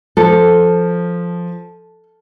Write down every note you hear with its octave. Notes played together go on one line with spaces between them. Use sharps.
F3 A4